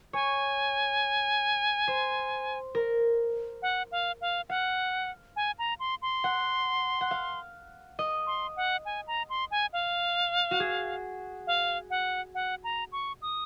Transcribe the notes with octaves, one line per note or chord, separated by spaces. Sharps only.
C#5 G#5
C5
A#4
F#5
F5
F5
F5 F#5
G#5
A#5
C6
C6
F#5
F#5
F5
D#5
C6
F#5
G#5
A#5
C6
G#5
F5
F#4
G#4
F5
F#5
F#5
A#5
C#6
D#6